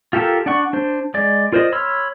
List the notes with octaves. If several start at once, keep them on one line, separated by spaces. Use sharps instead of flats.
F4 G4 A4 A#4 A5
D4 D5 F#5 C#6
D4 C5
G#3 D5
F4 A#4 C5 D5 D#5
C#5 B5 C6 E6 F6